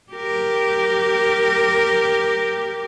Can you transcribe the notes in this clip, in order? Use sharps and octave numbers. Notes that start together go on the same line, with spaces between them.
G4 A#4